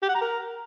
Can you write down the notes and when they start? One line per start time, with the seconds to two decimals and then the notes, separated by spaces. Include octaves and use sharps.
0.03 G4
0.09 F#5
0.15 A#5
0.21 A#4